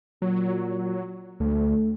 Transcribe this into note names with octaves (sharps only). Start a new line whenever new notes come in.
A#2 F#3
D2 A3